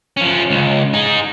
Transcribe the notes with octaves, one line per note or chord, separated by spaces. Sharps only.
F3 C#4
C#2
D#4 G#4